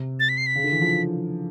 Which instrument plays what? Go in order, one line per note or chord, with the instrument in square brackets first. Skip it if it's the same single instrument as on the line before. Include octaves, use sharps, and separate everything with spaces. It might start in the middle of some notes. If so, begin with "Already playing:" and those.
Already playing: [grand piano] C3
[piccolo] A6
B6
C7
B6
[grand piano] C#3
D3
E3
F3